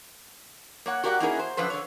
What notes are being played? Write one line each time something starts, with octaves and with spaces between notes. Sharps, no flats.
A#3 C#5 F#5
F#4 G4 A#4 D5 F5 F#5
A#3 C#4 D#4 E4 G#4 A#4
C5
F#2 D3 F3 B4 C5
D3 C#5